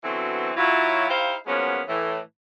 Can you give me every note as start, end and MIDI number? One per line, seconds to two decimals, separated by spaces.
0.04 0.52 47
0.04 0.52 50
0.04 0.52 52
0.04 0.52 54
0.04 0.52 60
0.56 1.06 54
0.56 1.06 64
0.56 1.06 65
1.09 1.36 63
1.09 1.36 64
1.09 1.36 67
1.09 1.36 72
1.09 1.36 77
1.46 1.81 53
1.46 1.81 54
1.46 1.81 56
1.46 1.81 58
1.46 1.81 59
1.46 1.81 61
1.88 2.19 45
1.88 2.19 52